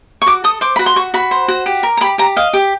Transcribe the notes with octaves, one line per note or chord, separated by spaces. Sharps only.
C#6
F#4 D6
A4 D#6
C5 D6
F#4 B5
C6
F#4 C#6
F#4 B5
C5
F#4
G4
A#4
A#5
G4 B5
G4 A#5
D#5 F5
G4